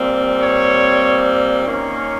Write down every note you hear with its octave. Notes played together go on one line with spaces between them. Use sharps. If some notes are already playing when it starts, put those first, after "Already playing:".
Already playing: A#2 G3 C4
C#5
D#3 A#3 C#4